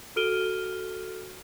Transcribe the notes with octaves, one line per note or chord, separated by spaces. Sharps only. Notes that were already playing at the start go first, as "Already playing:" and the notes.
F#4 A4 F6 D7 D#7 G7